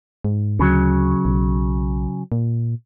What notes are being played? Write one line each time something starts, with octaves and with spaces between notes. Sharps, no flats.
G#2
D2 C#3 F#3
B1
A#2